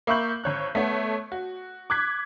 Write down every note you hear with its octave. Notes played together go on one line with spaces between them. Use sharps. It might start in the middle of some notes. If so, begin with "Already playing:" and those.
A#3 E5 B5 C#6 G6 F#7
G#1 C#5 F#6
A3 B3 C#5
F#4
D6 F#6 G#6 B6